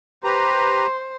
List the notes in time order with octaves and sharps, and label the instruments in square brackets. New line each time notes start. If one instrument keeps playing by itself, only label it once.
[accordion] G4 B4 A#5 [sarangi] C5